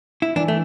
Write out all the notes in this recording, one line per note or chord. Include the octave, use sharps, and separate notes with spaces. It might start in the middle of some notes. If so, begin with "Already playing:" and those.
E4
E3 D4
A3